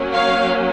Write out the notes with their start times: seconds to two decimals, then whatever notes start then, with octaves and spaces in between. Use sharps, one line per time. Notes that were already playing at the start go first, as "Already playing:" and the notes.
Already playing: F#3 A#3 C#4
0.13 C#5 F5